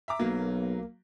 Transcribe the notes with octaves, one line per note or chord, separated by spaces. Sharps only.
E5 A#5 D6
B1 F#3 A#3